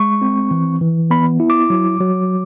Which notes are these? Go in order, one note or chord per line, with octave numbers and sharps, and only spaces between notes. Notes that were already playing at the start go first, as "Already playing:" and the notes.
Already playing: G#3 C#6
C4
E3
E3
B3 B5
E4
D6
F#3
F#3